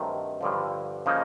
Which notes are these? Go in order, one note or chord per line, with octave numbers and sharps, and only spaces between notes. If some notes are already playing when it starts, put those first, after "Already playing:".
Already playing: G2 D#3 F#3 A3 C4
G2 D3 F3
C#3 F3 A#3 D#4